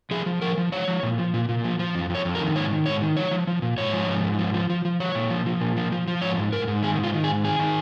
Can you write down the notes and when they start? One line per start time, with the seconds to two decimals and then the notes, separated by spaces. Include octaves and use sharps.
0.11 F3 G#4
0.26 F3
0.41 F3 A#4
0.58 F3
0.72 F3 C#5
0.88 F3
1.03 A#2
1.18 F3
1.34 A#2
1.49 A#2
1.64 F3
1.79 F3
1.95 F2
2.10 F2 C#5
2.25 F2
2.35 A#4
2.41 D#3
2.55 G#2 C#5
2.71 D#3
2.86 G#2 C#5
3.02 D#3
3.17 F3 C#5
3.31 F3
3.47 F3
3.62 A#2
3.77 G#2 C#5
3.93 F3
4.08 G#2
4.24 G#2
4.38 F3
4.54 F3
4.70 F3
4.85 F3
5.00 F3 C#5
5.15 A#2
5.30 F3
5.46 F3
5.61 A#2
5.77 F3
5.92 F3
6.07 F3
6.22 G#2 C#5
6.38 G#2
6.52 G#2 A#4
6.68 G#2
6.83 D#3 G#4
6.98 G#2
7.03 F4
7.14 D#3
7.24 G#4
7.28 G#2
7.44 D#3 G#4
7.59 D#3